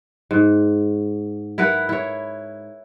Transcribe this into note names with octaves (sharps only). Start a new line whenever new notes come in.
G#2
E4 A#4 B4 F#5
E4 C#5